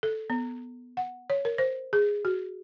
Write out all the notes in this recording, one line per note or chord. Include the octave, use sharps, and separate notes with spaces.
A4
B3
F#5
C#5
A#4
C5
G#4
F#4